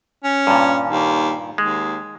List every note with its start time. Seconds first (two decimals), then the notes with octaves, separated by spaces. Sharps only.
0.24 C#4
0.47 G2 A#2
0.87 D#2
1.58 D#2 G#3